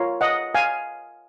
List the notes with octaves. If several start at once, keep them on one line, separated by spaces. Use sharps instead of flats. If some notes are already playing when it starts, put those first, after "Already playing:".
Already playing: F4 A#4 C#5
D#5 F#5
F5 G#5